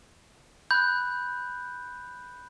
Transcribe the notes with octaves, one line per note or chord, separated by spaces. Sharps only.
B5 F#6 G6